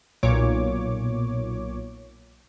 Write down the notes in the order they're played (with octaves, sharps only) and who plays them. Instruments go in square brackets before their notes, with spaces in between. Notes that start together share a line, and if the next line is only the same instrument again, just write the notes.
[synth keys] B1 A#2 C#5 D6